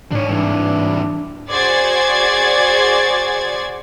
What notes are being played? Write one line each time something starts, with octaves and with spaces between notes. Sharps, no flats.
G#2 D4 C#5
G2 E3 D4
F#4 G#4 C5 D5 G#6 A6